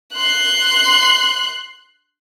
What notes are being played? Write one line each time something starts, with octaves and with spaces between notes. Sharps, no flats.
C6 F#6